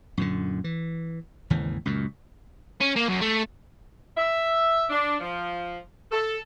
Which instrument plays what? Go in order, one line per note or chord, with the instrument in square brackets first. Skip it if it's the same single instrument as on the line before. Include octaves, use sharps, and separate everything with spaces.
[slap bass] F#2 A#2 D3
E3
G#1 D#2 C#3 E3
C#2 F#2 A#2
[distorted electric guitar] C#4
A#3
F#2
A3
[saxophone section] E5
D4
F3
A4